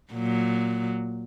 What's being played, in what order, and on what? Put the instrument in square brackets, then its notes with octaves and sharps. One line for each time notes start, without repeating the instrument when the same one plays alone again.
[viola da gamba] A#2 F#3